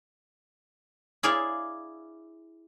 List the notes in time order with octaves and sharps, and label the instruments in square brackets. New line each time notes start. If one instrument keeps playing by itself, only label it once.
[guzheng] E4 G#4 D5 F5